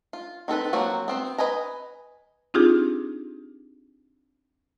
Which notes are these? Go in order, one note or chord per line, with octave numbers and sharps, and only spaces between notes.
F4
D#3 C4 A4 B4
F3 F#3 A#3 C4 F#4
B3 C4 C5
B4 D#5 G#5 A#5
C4 D4 D#4 F4 G4 G#4